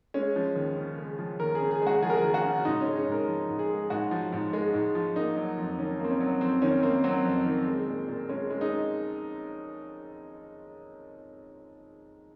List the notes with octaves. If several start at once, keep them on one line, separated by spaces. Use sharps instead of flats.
G#3 C#4
F3
D#2
C#3
G#3
F3
D#2 A#4
G#4
C#3
G#4
G#3
F#4
F3 G#4
A#4
G#4
D#2
F#4
C#3
G#2 D#4
G#3 C#4
C#4
G#2
A#4
F3
G#2
G#4
G#3
G#2 F#4
F3
G#2
G#3
G#2
F3
A#3 D#4
F#3
F2
D#3 C#4
A#3
C4
C#4
F#3
F2 C4
D#3 C#4
A#3 C4
F#3 C4
F2
D#3
G#3
A#2
A#2
G#3 C#4
G#3
D#4